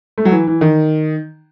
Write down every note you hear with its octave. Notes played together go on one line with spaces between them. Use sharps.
A3
F#3
E3
E3
D#3